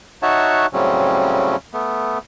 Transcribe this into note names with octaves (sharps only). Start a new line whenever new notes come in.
D#4 F#4 C#5 E5 F#5 A5
A2 C#3 F#3 G3 C4 C#4
A3 B3